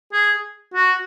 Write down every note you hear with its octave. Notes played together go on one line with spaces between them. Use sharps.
G#4
F#4